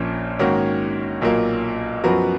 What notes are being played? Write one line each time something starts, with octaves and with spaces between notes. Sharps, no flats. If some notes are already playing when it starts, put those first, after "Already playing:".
Already playing: A#1 A#2 F3 A#3 C#4
G#2 D#3 A#3 C#4 F#4
B1 A#2 F#3 A#3
F#2 F3 B3 F#4 A#4